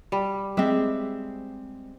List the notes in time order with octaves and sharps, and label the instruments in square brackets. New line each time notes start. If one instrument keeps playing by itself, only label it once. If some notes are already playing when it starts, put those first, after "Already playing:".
[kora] G3
[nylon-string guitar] G#3 C4 [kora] G4 E5